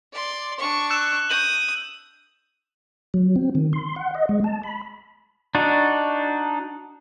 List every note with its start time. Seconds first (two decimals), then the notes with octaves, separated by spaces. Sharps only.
0.13 D5 C6
0.58 D4 C#6
0.90 E6 F#6 E7
1.30 D#6 G6 D#7 F#7
3.14 F#3
3.36 C4
3.55 D#3
3.73 C6
3.96 F#5
4.15 D#5
4.29 G#3
4.44 A5
4.63 B5
5.55 D4 D#4 F#4